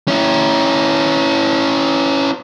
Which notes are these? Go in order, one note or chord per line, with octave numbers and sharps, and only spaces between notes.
C#4 E4